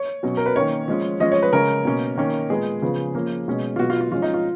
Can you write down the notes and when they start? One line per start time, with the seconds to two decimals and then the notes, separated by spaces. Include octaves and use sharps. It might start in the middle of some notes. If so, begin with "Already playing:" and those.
Already playing: C#5
0.23 B2 F#3 C#4
0.37 A#4
0.46 B4
0.56 D#3 A#3 C#4 C#5
0.88 F3 G#3 C#4
1.20 F3 G#3 C#4 D#5
1.32 C#5
1.42 B4
1.53 C#3 G#3 C#4 A#4
1.85 B2 A#3 C#4
2.17 D#3 A#3 C#4
2.50 A#2 G#3 B3 G#4
2.82 C#3 F3 B3
3.15 F3 A#3 C#4
3.48 B2 G#3 C#4
3.76 F4
3.79 B2 F#3 B3 F#4
3.90 F4
4.01 F4
4.11 F3 G#3 C#4 F4
4.22 D#4
4.34 F4